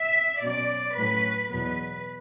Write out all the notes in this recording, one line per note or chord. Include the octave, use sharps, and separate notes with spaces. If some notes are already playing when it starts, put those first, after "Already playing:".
Already playing: E5
B2 F#3 C#4 D5
A2 F#3 A3 C#4 B4
E2 B2 F#3 B3 B4